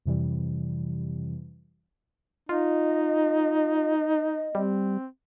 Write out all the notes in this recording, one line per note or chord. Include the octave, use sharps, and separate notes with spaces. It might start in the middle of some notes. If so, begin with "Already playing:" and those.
F2 C3 E3 G3
D#4 F4 D#5
G3 C4